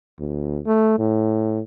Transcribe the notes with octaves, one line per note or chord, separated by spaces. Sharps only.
D2
A3
A2